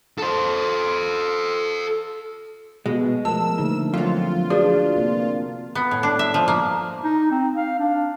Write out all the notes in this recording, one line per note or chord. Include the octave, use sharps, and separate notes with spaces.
A4 C5
B2 G#3
F3 A3 A#4 A5 E6
D3 A3 A#3 D#4
F2 F#3 F4
D4 F#4 G#4 B4
C3 A#3 C4
B3
A2
D4
E5
F3
A#3
D#4
C4
F5
D4